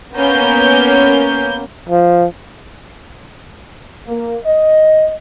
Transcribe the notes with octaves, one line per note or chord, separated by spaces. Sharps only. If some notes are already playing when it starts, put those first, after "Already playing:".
A#3 B3 C#4 G6
F3
A#3
D#5